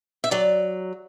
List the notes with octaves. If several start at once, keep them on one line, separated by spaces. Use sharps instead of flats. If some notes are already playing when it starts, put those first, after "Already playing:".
E5
F#3 D5